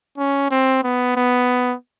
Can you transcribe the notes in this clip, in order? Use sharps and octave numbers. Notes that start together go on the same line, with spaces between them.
C#4
C4
B3
B3